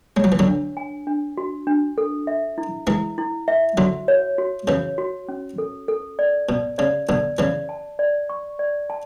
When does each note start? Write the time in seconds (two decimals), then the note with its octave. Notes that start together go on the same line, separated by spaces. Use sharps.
0.17 G#3 C#5
0.24 F#3
0.32 E3
0.39 D3 F#3
0.47 D4
0.77 G#5
1.07 D4
1.37 F#4
1.67 D4
1.98 A4
2.27 E5
2.58 E4
2.87 E3 G#3 E4
3.18 E4
3.48 E5
3.77 D3 F#3 F#4
4.08 C#5
4.38 F#4
4.68 C#3 E3 C#5
4.98 F#4
5.29 C#4
5.58 A4
5.88 A4
6.19 D5
6.49 B2 D5
6.78 C#3 D5
7.09 B2 D3 D5
7.38 C#3 E3 D5
7.69 A5
7.99 D5
8.29 C#6
8.59 D5
8.90 A5